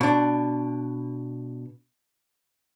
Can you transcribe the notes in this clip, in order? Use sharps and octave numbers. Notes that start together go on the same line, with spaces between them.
B2 D4